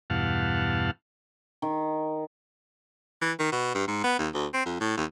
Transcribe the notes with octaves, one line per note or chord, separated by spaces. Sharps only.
E2 G2 B2 F5 F#5 A5
D#3
E3
D#3
B2
G2
G#2
B3
D#2
D2
C4
F2
A2
D#2